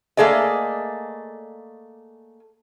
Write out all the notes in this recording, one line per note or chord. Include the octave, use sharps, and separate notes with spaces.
A3 A#3 G#4 D5 D#5